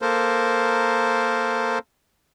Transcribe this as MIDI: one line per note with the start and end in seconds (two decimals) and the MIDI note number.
0.02 1.79 58
0.02 1.79 69
0.02 1.79 70
0.02 1.79 72